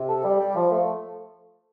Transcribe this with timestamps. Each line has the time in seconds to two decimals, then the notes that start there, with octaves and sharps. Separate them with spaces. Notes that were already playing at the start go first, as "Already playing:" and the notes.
Already playing: C3
0.08 A4
0.24 G3
0.39 G3
0.55 F3
0.71 A3